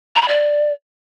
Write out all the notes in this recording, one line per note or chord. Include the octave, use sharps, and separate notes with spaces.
A#5
B5
D5